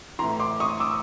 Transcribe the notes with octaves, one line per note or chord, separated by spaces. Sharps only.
A2 E3 A#5 C6
C6 D6
C#6 D#6
D6 E6